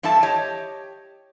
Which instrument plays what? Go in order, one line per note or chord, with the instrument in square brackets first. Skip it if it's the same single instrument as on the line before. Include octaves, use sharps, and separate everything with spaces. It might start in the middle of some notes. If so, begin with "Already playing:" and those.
[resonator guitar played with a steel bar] G2 E3 E4 A4 E5 A5
G4 C#5 D#5